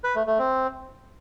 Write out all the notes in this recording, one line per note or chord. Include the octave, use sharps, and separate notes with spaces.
B4
A3
A3
C4